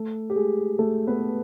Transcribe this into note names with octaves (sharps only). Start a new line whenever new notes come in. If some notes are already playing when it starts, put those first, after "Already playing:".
Already playing: A3 A4
G4
G#3 G#4
A3 A4
B3 B4